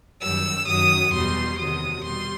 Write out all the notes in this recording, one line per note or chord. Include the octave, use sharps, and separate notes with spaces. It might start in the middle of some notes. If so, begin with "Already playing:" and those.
F#2 D#3 G3 E6
F#2 D#3 F#3 D#6
E2 B2 G3 C6
E2 C3 D#3 F#3 D#6
B2 G3 C6